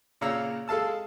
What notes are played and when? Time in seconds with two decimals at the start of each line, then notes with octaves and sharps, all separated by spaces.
0.21 A#2 C#3 C#5 F5 A#5 E6
0.68 G#3 A4 F5 A5 E6